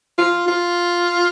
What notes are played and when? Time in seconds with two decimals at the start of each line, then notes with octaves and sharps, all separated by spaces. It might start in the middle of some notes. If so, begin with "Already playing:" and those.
0.18 F4
0.48 F4